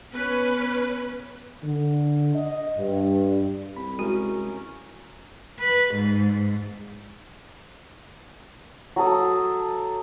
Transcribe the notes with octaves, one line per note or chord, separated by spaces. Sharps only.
B3 C#4 B4
D3
D#5
G2
C2 B5
G#3 C#4 E4 F#4 A#4
B4
G#2
F#3 A4 D#6